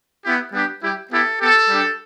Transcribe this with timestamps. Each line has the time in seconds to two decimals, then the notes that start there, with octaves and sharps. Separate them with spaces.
0.23 B3 E4 G4
0.52 G3 B3 D4 G4
0.81 G3 E4 G4
1.10 B3 E4 G4 A4
1.39 B3 G4 A4
1.69 G3 D4 G4